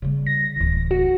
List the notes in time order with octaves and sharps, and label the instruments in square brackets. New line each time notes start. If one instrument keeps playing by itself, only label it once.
[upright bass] C#3 G3
[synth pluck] A#6
[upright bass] D1 E3
[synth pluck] F#4